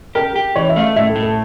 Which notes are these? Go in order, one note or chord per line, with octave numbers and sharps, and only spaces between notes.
G4 A#4
G4
E3 C#5
E5
A3 F5
E5
A2 E5
A4
A2
A4